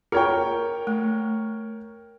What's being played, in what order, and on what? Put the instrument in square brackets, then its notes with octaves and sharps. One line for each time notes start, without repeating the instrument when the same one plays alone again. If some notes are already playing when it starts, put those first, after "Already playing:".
[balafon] F4 [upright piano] A#4 C#5 G5
[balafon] A3